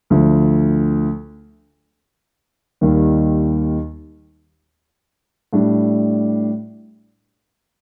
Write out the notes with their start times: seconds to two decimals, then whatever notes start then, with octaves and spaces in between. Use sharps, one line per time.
0.10 D2 D3 F3
2.81 D#2 D#3 G3
5.53 A2 G3 D4